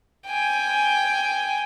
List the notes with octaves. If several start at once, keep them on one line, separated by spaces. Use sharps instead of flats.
G5 G#5